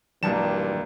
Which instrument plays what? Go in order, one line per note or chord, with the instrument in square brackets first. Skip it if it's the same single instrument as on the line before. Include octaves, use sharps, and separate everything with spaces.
[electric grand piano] B1 A5 E7 [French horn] G2 [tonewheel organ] E3 [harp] G3 G#3 A#3